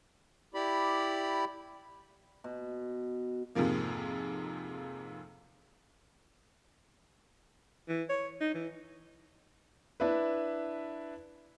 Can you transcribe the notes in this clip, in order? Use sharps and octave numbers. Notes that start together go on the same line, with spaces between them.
E4 G4 D5 B5
B2
F2 G#2 C3 F3 A#3
E3
C#5
D#4
E3
D4 E4 B4